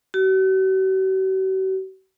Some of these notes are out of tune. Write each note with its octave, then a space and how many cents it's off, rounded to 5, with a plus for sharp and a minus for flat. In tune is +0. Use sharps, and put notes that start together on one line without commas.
F#4 +45